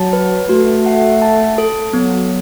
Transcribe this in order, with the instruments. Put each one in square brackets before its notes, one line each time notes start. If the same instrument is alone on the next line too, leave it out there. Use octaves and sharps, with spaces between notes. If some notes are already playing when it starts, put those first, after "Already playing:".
Already playing: [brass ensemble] F#3 [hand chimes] A5
[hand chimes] B4
[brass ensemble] A3 [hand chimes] F#4
[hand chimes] F#5
A5
A4
[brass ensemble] F#3 [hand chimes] B3